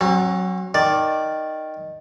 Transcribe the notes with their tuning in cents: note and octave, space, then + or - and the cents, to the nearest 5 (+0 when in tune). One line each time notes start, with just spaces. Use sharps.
F#3 +0 C4 +45
D#3 +0 D5 +0